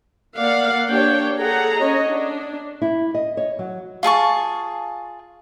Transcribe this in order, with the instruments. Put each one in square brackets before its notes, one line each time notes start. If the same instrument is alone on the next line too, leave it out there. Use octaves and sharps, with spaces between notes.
[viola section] A#3 D5 F5 F#5
A#3 D4 G4 C#5 G5
G#4 A4 F#5 A#5
C#4 C#5 D#5
D4
[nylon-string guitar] E4
D#5
C#5
F#3
[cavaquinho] F4 G#4 A5 C#6